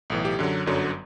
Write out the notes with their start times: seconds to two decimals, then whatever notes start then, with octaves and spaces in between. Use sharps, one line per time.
0.10 B1 A2 E3
0.25 G4
0.39 F#2 D3 F#3
0.66 G1 F#2 D3 F#3